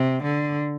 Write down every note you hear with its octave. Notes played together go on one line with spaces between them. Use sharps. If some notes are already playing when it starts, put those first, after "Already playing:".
Already playing: C3
D3